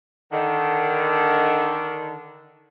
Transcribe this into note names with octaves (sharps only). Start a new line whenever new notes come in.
D3 D#3